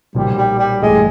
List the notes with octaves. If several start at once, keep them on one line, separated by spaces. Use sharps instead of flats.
B1 A#2 F3 G3
G3
G3
A1 G2 E3 G#3 A3